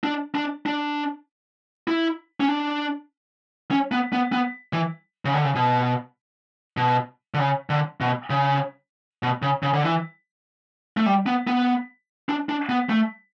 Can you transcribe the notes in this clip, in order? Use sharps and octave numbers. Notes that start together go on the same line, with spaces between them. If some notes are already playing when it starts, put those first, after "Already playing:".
D4
D4
D4
E4
C#4
D4
C#4
B3
B3
B3
E3
C#3
D3
C#3
B2
B2
D3
C#3
D3
B2
C#3
B2
C#3
C#3
D3
E3
A3
G3
B3
B3
D4
D4
B3
A3